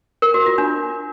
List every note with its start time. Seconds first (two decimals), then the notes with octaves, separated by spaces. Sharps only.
0.22 A#4
0.34 F#4
0.46 F4
0.58 D4